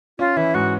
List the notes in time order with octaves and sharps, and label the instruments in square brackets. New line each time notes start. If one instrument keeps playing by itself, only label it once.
[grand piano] C#4 [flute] F4
[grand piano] E3 [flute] E4
[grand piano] G#2 [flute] F#4